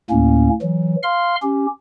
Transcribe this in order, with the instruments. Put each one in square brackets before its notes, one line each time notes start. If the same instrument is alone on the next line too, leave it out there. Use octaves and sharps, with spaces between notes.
[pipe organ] D2 A2 A#3 C#4
E3 F#3
F5 C6 F6
C#4 G4